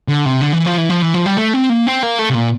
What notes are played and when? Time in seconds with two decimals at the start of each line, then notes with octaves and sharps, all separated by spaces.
0.08 D3
0.26 C3
0.41 D3
0.53 E3
0.66 F3
0.78 E3
0.89 F3
1.02 E3
1.14 F3
1.26 G3
1.37 A3
1.53 C4
1.70 A#3
1.87 C4
2.03 A#3
2.19 A3
2.30 C3
2.34 A#2